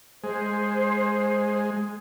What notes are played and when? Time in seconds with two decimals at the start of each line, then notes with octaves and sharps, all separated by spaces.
0.24 G#3 C5